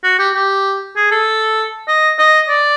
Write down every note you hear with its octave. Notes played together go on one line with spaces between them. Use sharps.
F#4
G4
G4
G#4
A4
D#5
D#5
D5